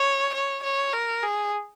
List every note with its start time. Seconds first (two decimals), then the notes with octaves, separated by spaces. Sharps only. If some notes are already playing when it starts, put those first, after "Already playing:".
Already playing: C#5
0.34 C#5
0.63 C#5
0.93 A#4
1.23 G#4